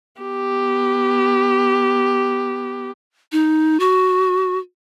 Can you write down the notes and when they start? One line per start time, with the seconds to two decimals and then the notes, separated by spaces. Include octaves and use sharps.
0.21 B3 G4
3.32 D#4
3.80 F#4